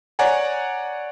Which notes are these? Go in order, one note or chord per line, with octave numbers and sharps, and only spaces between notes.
C#5 D5 F#5 G#5 A#5